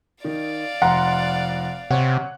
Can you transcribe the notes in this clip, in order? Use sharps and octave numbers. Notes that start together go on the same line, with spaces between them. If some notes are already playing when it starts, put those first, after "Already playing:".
D#3 D5 F5
F1 F#5 A#5 C6
C3 C#5 F#5